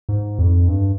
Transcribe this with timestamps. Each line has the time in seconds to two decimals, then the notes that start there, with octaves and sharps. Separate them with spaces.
0.09 G#2
0.39 F2
0.68 G2